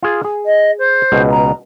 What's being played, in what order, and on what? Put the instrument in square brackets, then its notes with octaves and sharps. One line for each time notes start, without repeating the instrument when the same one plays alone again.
[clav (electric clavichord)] F4 G#4
G#4
[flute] D#5
C5
[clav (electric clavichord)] C#2 B2
[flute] A#5